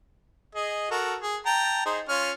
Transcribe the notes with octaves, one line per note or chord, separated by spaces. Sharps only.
G#4 D#5
F#4 A4 A#4
G#4
G5 A5 A#5
D#4 G#4 C5
C#4 F4 F6